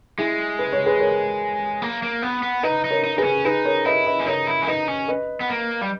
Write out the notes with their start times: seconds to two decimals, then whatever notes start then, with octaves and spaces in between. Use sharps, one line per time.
0.18 G#3 E4 G#4
0.59 B4
0.73 C#5
0.86 G#4 B4
1.00 A#4 C#5
1.82 A#3
2.03 A#3
2.22 B3
2.43 B3
2.63 D#4 B4 D#5
2.84 D#4
2.90 A#4 C#5
3.04 D#4
3.18 D#4 G#4 B4
3.24 C#4
3.45 D#4 G#4 B4
3.65 A#4 C#5
3.86 E4 B4 D#5
4.06 B4 D#5
4.20 C#4
4.26 D#4 A#4 C#5
4.47 E4
4.62 C#4
4.67 D#4 B4 D#5
4.88 C#4
5.08 B4 D#5
5.41 B3
5.50 A#3
5.81 G3